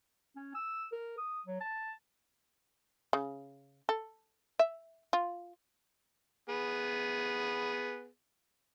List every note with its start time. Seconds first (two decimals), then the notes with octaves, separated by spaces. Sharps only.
0.36 C#4
0.55 E6
0.92 A#4
1.18 D#6
1.46 F#3
1.61 A5
3.13 C#3
3.89 A4
4.59 E5
5.13 F4
6.49 B3 G#4